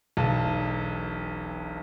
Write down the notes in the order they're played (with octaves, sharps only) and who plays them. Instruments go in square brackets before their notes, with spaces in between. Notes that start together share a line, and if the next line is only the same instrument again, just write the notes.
[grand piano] E1 B1 A5